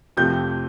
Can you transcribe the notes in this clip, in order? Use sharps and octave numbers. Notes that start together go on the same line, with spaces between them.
F2 C3 F3 A3 G6